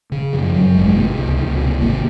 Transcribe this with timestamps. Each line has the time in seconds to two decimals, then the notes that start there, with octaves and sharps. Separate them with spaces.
0.12 C#3
0.33 F#2 F3
0.54 F#2 F#3
0.75 G#1 G#3
0.96 C3 A#3
1.18 C#2
1.39 C#2
1.61 C3
1.81 G#1 A#3